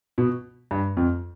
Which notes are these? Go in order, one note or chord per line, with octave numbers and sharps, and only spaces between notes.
B2
G2
F2